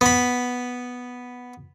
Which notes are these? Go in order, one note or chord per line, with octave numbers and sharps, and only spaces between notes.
B3 B5